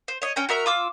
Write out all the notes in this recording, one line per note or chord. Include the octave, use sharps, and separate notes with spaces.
C5
C#5 D#5
C#4 G5 A#5
F#4 A#4 E5 A#5
F4 D6 E6